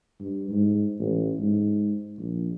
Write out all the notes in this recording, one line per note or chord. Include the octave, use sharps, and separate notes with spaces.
G2
G#2
A1
G#2
A#1